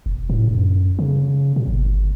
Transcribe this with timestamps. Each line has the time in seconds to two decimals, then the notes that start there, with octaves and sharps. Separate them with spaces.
0.06 E1
0.30 A2
0.47 F#2
0.99 C#3
1.56 A#2
1.68 G1